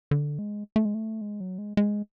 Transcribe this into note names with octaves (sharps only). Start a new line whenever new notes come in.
D3
G#3
A3
G#3
A3
G#3
F#3
G#3
G#3